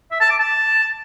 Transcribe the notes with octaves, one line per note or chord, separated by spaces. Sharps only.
E5
A5
D6
A5